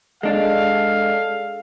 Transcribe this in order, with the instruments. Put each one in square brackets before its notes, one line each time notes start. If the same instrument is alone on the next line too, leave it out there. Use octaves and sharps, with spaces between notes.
[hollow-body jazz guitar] G#3 D4 [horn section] A4 F5